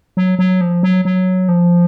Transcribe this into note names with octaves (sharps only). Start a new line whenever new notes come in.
F#3
F#3
F3
F#3
F#3
F3